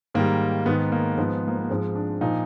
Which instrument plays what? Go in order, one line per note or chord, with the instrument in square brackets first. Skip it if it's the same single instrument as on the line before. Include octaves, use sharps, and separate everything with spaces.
[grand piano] G#2 D#3 G3 A#3
G#2 D#3 G#3 B3
A#3
G#2 F3 G#3 B3
A#3
B3
G#2 F3 G#3 C4
D4
A#2 F3 D#4